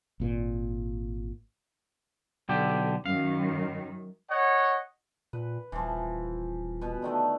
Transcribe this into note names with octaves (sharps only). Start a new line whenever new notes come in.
G#1 A#2
B1 D3 G4
F#2 D#3 F5
C#5 D#5 F#5
A#2 B4
D#1 E3 F3
B2 B4
D3 D#3 A3